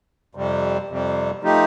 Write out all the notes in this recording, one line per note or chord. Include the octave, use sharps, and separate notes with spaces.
F2 C3 G3
F2 C3 G3
F3 A3 D#4 G4